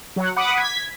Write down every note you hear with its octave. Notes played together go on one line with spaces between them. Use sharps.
F#3 F#5
F#5 B5 D6 D#6
G#6 B6